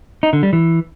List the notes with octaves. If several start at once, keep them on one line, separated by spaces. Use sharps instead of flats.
D#4
D3
G3
E3